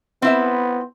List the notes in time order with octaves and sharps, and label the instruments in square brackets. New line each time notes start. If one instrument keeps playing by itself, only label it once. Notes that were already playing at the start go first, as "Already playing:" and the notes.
[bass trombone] B3 [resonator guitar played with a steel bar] C4 E4 E5